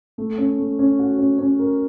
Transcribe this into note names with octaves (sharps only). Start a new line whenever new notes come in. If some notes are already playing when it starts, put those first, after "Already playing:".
A3
C#4
A3
C#4
F#4
C#4
C#4
A#4